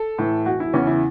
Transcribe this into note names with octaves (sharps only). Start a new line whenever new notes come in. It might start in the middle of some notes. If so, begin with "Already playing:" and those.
Already playing: A4
A2 E3
E1 F#4
E4
E2 C#3 E3 C#4
E4